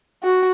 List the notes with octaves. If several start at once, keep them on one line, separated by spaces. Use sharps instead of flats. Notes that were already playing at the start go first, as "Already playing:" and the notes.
F#4